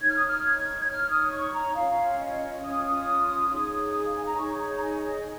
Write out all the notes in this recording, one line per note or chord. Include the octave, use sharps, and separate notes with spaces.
D#4 C#5 G#6
F6
D#6
F6
G#6
G#6
D#4 C#5 F6
D#6
C#6
A#5
C#4 F4 C#5 F5
D#5
C#4 F4 C#5 D#6
D#4 G#4 C#5
F5
G#5
A#5
D#4 G#4 C#5 C#6
A#5
G#5
D#5
G#4 C#5